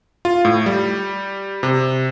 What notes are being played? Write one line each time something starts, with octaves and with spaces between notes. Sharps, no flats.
F4
A2
G3
C3